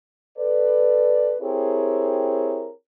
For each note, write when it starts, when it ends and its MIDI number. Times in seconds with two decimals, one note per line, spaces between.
0.38 1.35 69
0.38 1.35 71
0.38 1.35 74
1.42 2.70 60
1.42 2.70 64
1.42 2.70 67
1.42 2.70 68
1.42 2.70 70
1.42 2.70 73